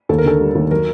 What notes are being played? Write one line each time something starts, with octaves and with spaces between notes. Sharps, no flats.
D#2 A4
A#4
D3 A4
G3
D#2
F#3 A#4